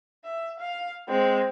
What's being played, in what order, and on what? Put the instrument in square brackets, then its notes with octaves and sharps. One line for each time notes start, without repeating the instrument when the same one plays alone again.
[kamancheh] E5
F5
G#3 C4